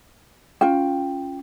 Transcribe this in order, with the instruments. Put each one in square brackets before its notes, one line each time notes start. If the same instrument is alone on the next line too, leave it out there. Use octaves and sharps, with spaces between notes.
[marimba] C#4 [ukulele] F4 G5